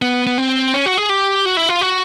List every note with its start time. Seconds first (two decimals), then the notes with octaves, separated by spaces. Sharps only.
0.02 B3
0.27 B3
0.38 C4
0.74 C#4
0.86 F#4
0.98 G#4
1.09 G4
1.45 F#4
1.57 E4
1.69 F4
1.81 F#4